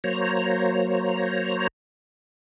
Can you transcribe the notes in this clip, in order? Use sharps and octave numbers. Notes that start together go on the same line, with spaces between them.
F#3 A#3 C5 C#5 A#5